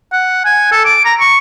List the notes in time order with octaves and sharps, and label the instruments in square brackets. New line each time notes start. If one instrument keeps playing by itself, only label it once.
[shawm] F#5
G#5
A4
D6
A#5
C#6